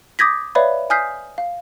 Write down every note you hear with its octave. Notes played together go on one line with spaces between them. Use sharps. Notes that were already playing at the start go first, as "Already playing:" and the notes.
D6 D#6 G6 G#6 A#6 B6
B4 C#5 D5 E5 F5 B5
G#5 D#6 F6 G6 B6 C7
F5